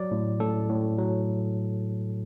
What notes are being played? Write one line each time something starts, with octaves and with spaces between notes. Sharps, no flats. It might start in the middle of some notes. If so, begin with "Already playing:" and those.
Already playing: F#3 D5
A2
A2 A4
A2
F#3